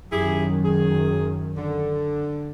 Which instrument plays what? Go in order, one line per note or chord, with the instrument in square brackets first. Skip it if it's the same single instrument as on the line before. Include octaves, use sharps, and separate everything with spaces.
[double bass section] F#2 D#3 [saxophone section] E4 G4 G#4
[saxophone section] G#4
D3